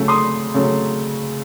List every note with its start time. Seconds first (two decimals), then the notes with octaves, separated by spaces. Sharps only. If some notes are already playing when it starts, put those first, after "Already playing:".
Already playing: C#3 F#3 A3
0.08 C6 D#6
0.54 C#3 F#3 A3